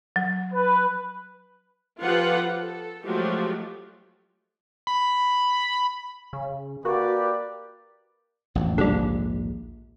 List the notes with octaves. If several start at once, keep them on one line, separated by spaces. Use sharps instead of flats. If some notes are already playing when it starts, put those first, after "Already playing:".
F#3
B4
F3 F4 G4 A4 B4 F#5
A4
F3 F#3 G#3 A3 F#4 G4
B5
C#3
A#3 F#4 G4 B4 D5
A1 F2
A#1 D#2 G#2 D3 G3